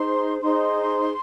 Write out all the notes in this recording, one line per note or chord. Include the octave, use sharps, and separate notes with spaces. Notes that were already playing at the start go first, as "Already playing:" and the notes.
Already playing: D#4 G#4 C5 C6
D#4 G#4 C5 C6